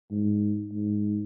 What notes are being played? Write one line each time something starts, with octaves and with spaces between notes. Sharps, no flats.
G#2
G#2